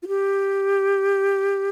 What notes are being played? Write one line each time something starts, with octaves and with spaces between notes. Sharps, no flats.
F4
G4